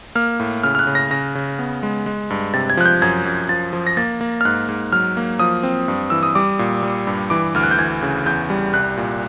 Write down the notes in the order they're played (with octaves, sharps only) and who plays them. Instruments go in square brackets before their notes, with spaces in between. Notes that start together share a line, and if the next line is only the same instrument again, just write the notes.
[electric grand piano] A#3 F6
A2
C#3 F6
F6
F#6
C#3
A#6
C#3 A#6
C#3
B3
G#3
G#3
G2
C3 A6
G#6
F3 F#6
G6
F#2 G#6
F#2
F3 A6
F3
A#6
A#3 A6
A#3
F6
G#2 F#6
G#2
F#3 F6
A#3
F3 D#6
C4
G2
E3 E6
D#6
G3 D6
A#2
G3
G2
E3 D6
D2 F6
F#6
G6
E3 G#6
C#3
E2 G6
G3
C2 F#6
A#2